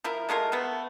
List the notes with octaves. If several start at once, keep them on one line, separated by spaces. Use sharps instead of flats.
F3 E4 A#4
G#3 A3 F4 A#4
A3 B3